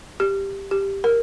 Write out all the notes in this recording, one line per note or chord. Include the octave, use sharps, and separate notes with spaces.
G4
G4
A#4